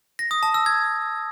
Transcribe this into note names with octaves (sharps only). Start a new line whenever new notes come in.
A#6
D#6
A5
E6
G#6